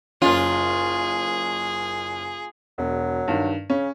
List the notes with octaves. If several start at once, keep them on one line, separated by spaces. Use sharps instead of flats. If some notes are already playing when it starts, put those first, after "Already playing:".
F#1 C#4 F4 G#4
E1 F#3
G2 D#3
C#3 C#4